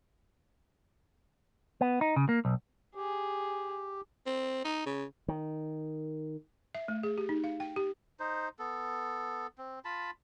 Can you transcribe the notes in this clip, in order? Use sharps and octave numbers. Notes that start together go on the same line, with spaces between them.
B3
D#4
C#3
A#3
B1
G4 G#4
C4
D#4
C#3
D#3
E5
A3
G#4
G4
D#4
F5
G5
G4
D#4 C5
B3 A4
C4
F4 A5 B5